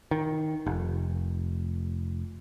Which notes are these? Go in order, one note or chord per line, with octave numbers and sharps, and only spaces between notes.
D#3
F1